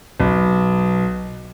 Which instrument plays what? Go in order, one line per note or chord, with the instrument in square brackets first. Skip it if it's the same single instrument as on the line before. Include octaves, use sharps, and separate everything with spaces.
[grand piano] B1